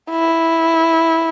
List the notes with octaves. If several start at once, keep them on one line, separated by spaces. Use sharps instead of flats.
E4